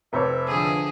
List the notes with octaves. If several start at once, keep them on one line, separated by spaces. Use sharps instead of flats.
F1 C5 C#5 E5
D3 F3 G#4